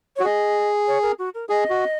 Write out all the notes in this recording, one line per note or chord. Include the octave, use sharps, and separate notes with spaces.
C#5
F#4
G#4 D#5
C#5
A#4
F#4
A#4
G#4 D#5
F#4